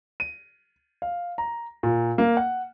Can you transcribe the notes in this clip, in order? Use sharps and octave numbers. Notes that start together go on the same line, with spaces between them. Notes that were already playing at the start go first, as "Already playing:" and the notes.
D#7
F5
A#5
A#2
A#3
F#5